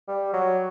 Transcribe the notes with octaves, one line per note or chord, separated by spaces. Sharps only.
G3
F#3